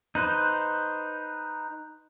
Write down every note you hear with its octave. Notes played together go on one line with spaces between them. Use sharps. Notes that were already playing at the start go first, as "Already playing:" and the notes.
D#4 B4 C5